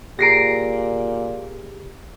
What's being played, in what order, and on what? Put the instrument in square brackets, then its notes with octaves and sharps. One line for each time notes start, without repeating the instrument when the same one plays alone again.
[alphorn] A#2 [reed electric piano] G4 G#4 A#5 [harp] A#6 C7 D7